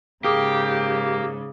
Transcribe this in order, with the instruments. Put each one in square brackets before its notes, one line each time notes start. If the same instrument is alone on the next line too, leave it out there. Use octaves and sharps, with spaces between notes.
[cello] G#2 C#3 [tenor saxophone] A#3 [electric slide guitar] G4 [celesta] G#4 D6 D#6